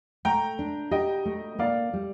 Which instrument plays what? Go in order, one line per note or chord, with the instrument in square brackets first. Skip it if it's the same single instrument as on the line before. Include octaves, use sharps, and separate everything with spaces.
[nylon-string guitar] A3 [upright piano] G5 A#5
[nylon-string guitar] D4
[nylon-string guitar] G4 [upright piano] D#5 G5
[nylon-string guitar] A3
[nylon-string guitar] A#3 [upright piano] D5 F5
[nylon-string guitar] G3